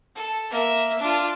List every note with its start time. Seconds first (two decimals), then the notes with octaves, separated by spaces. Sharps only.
0.16 A4
0.50 A#3 E5
0.99 D4 F4